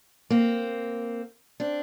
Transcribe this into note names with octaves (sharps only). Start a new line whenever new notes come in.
A#3 C4
C4 D4